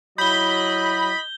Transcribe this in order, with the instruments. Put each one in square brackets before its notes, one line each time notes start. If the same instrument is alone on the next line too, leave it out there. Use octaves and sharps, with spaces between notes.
[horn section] F#3 E4 [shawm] D#5 [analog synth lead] B5 [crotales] G6 G7